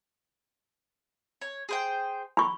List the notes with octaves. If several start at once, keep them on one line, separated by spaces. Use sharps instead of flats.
C#5
G#4 C5 G5
B5 C#6